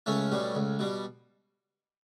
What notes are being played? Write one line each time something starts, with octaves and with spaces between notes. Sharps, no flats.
C#2 A3 C#4
B2 G3
C#2
B2 G3